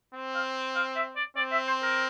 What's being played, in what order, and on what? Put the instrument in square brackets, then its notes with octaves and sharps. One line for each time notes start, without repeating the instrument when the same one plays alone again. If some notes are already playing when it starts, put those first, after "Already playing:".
[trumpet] C4
[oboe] F5
F5
E5
D5
[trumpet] C4 [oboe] D5
[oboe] E5
C5
A#4